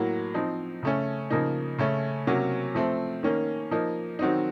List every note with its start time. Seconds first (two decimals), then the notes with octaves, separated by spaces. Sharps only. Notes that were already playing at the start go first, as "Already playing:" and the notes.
Already playing: A2 F#3 A#3
0.34 F3 C4 D#4
0.83 C#3 A3 C#4
1.30 C#3 F3 A#3 D#4
1.79 C#3 A3 C#4
2.27 C3 F#3 A#3 C#4
2.75 F3 A3 C4
3.23 D#3 A#3 C#4
3.71 F3 A#3 D#4
4.19 D#3 F#3 C4 D#4